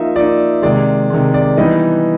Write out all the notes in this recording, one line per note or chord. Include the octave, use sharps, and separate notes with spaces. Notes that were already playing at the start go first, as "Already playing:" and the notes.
Already playing: F3 A#3 D#4 E5
F3 A#3 D#4 D5
C3 D#3 G#3 D5
C3 D#3 G#3
D5
E3 G3 B3 D#4 D#5